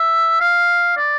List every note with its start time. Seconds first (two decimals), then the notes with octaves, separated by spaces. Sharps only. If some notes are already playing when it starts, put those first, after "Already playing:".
Already playing: E5
0.40 F5
0.97 D5